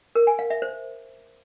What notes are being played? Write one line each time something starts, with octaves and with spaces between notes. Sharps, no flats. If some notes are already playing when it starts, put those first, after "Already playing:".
A#4
G#5
F5
E5
C5